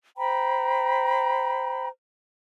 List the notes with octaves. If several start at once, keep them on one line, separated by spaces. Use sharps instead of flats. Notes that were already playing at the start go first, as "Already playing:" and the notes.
C5 G5 A#5 B5